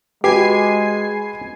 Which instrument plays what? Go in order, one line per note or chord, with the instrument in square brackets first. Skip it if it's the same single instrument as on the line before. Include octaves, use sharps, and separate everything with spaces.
[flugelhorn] G#3 [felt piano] F#4 B4 [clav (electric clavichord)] G4 [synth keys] G#5 C7